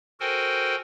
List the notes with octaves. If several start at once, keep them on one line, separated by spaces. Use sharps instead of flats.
F#4 A4 A#4 C5 G5 G#5